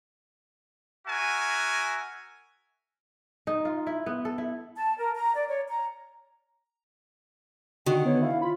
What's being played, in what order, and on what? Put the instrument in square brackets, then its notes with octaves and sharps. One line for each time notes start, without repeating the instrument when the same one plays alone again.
[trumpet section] F#4 A#4 E5 G#5
[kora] D#4
F4
E4
B3
A4
E4
[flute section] A5
A#4
A#5
D5
C#5
A#5
[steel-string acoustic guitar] D3 D#3 [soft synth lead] F#4 [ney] G5
[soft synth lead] B3 [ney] C#5
[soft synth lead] E4 [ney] F5
[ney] F4 [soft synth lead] B5